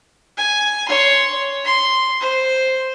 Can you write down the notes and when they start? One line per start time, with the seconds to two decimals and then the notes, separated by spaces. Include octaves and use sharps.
0.37 G#5
0.88 C#5 C6
1.65 C6
2.20 C5